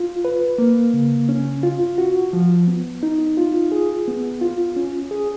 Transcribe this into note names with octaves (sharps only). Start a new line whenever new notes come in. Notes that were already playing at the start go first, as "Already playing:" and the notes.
Already playing: F4
B4
A#3
C#3
C#4
F4
F#4
F3
B3
D#4
F4
G#4
B3
F4
C#4
G#4